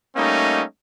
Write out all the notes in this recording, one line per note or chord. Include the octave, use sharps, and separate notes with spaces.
G3 A3 A#3 C#4 D#4 D#5